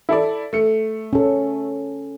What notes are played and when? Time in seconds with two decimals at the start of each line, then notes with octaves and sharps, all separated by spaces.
0.09 E4 A4 D5
0.53 A3 C#7
1.13 C#4 A4